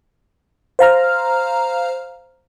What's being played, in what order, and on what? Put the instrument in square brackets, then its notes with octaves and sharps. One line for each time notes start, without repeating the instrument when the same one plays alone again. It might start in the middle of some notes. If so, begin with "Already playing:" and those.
[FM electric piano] C5 F5 A#5 F6